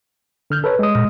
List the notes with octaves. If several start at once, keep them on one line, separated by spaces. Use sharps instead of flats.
D3 F6 G6
A4 B4 C#5
G#3 D#6
A#2